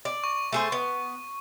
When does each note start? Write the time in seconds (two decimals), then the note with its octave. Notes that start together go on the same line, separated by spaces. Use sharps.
0.05 D5
0.24 C#6
0.52 A3 G#4 C5
0.72 B3